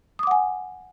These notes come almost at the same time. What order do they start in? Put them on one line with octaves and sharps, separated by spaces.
D#6 D6 F#5 G#5